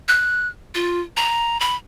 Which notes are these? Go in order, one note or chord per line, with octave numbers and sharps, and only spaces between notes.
F#6
F4
A#5
B5